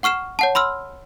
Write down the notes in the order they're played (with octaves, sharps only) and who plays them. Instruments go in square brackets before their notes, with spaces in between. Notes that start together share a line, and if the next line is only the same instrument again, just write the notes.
[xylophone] F#5 C#6 F6 C7 E7
C#5 F#5 A5
B5 C6 E6 F6